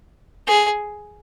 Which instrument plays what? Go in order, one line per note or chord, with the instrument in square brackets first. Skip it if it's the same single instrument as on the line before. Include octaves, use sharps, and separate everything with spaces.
[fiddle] G#4